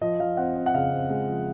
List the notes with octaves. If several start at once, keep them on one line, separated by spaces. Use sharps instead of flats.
F3 D#5
F3 F5
C4 F#5
C4
F#5
C#3 F5
C4
G#3
F3